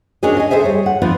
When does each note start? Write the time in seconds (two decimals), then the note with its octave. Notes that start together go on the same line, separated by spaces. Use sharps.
0.23 C#4 D4 F#4 G#4 A#4 D#5
0.37 D#5 G#5
0.50 G#4 A4 C5 E5 G#5
0.64 G3 C#5
0.86 F#5
1.02 F3 B3 C4 F4 D5